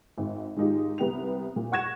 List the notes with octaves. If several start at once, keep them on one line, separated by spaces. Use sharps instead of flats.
G#1
G#2 D#3 G#3 D#4 F4 G4
C2 C3 B3 G5 F7
A#2
F#5 C#6 F#6 G#6 A#6 E7